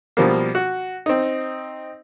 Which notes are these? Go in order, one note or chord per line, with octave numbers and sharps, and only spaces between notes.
B2 F3 G3 A#3
F#4
C4 D#4